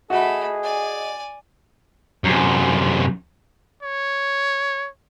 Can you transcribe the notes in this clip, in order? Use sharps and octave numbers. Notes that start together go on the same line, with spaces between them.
A3 F#4 G#4 D#5 B5
D5 G#5
F#2 C3
C#5